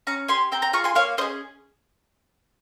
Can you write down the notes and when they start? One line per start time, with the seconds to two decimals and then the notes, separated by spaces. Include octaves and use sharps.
0.07 C#4 A#5 C#6
0.28 G4 G#5 C6
0.51 C4 G5 A#5
0.62 G5 A#5
0.73 F4 G#4 A#5 C#6
0.84 G#5 C6
0.95 A#3 C#5 F5
1.17 C#4 C5 D#5
1.21 G#4